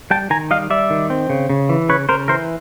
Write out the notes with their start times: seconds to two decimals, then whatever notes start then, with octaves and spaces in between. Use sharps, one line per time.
0.11 G3 G5 A5
0.30 D#3 G#5 A#5
0.51 G3 D#5 F5
0.70 G3 D5 E5
0.90 D#3
1.10 C4
1.30 C#3
1.50 C#3
1.69 E3
1.89 C#3 B4 C#5
2.09 C#3 A#4 C5
2.28 E3 A#4 C5